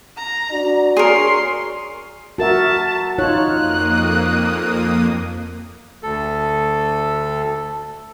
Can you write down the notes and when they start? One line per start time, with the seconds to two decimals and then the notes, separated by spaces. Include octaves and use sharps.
0.17 A#5
0.51 D4 F#4 D5
0.97 G#4 A#4 C#5 C6
2.38 F#4 A#4 E5 A5
3.18 D#4 F4 C#5 F6 F#6
3.52 F2 A#3 D#6
6.03 D2 A4